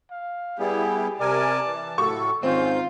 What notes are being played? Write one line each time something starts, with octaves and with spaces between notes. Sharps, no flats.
F5
G3 B3 E4 G4 G#4
C3 A#4 D5 G#5 A5
E3
A2 F#4 A4 C#6
G#2 D#3 C4 C#4 F4 G6